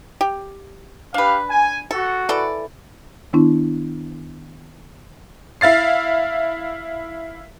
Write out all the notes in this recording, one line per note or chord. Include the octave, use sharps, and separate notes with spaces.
G4
D4 G4 B4 F5
G#5
F#4 A4
E3 A4 D5
D#3 B3 D4 E4
E4 F5 A6 C7